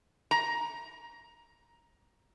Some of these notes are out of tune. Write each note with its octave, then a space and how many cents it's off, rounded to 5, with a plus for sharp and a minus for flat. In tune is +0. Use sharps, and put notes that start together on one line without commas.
A#5 +10